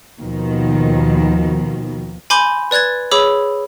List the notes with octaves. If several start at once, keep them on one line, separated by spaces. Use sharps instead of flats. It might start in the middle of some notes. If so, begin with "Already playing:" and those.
D#2 B2 D#3 F3
G#5 B5 C6 D6 G6
B4 D5 F#6 G#6 A6
G#4 C#5 B5 D6 E6